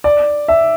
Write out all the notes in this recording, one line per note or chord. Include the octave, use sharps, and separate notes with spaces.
D5
E5